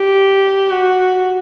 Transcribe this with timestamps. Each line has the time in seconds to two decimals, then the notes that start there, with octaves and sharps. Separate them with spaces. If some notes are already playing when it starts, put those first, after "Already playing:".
Already playing: G4
0.70 F#4